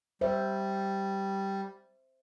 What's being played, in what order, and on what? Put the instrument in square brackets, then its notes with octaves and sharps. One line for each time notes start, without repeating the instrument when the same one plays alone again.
[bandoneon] G3 [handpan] C5 E5